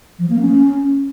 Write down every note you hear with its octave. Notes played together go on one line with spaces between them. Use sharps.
F3
A#3
C#4